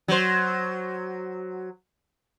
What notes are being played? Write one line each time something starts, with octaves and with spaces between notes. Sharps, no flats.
F#3 C5